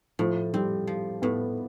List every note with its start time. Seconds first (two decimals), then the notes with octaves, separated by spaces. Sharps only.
0.19 A2 F3
0.54 G3 C4
0.87 F3
1.22 A2 B3